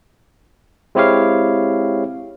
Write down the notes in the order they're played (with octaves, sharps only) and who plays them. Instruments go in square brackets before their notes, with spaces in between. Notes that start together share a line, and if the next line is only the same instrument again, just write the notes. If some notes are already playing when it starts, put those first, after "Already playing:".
[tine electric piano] G#3 C4 E4 G4 C#5 F5